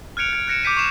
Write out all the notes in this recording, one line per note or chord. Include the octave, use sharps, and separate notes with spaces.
F6 F#6 G#6 C#7 D7 F7
F6 G#6 D7
F#6 G#6 A#6 C#7 D7 E7
D6 G6 B6 D#7
C#6 C7 E7